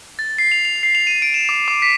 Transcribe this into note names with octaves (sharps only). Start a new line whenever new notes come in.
A6
C7
F7
F7
C7
F7
D#7
D7
E7
D6
D6
B6